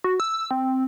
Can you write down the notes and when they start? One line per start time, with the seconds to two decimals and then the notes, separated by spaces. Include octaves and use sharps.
0.04 F#4
0.20 E6
0.51 C4